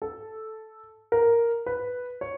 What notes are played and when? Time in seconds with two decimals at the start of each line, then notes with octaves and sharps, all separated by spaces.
0.02 A4
1.12 A#4
1.66 B4
2.21 C#5